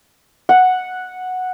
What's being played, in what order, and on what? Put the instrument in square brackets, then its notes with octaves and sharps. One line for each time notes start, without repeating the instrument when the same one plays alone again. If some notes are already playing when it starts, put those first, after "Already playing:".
[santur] F#5